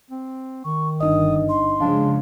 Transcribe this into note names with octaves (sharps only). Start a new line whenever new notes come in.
C4
D#3 C#6
G1 D4 D#4 D#5 D#6
C6
C#3 F3 G#3 D4 F5